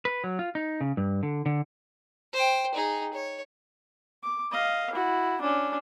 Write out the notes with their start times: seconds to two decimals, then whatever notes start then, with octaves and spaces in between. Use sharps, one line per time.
0.05 B4
0.24 F#3
0.39 F4
0.55 D#4
0.81 C#3
0.97 G2
1.23 D3
1.46 D3
2.33 C5 G5
2.74 D#4 G#4
3.13 C#5
4.23 D6
4.52 D#5 F5
4.93 E4 F#4
5.41 C#4 D4